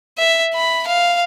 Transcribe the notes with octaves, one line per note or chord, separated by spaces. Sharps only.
E5
B5
F5